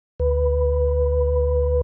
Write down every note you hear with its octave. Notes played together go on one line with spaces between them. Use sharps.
D2 B4